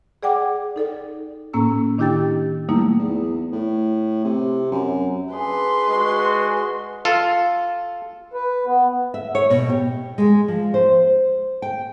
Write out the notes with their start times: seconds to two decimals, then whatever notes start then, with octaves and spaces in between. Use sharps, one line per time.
0.23 G#4 D5 F#5 G5 D6
0.76 D#4 A4 D5
1.53 A2 A#3 C#4 E6
1.98 D#3 D4 E4 G4 G5 A6
2.69 F#3 G3 A3 A#3 D#4 E4
2.99 E2
3.52 A2
4.24 C3
4.72 F#2
5.32 D4 F4 G#4 B4 C6
5.88 G#3 F#4
7.05 F4 A4
8.34 B4
8.66 B3
9.14 E5
9.35 C#5
9.50 B2
9.69 G4
10.18 G#3
10.48 F3
10.74 C5
11.62 G5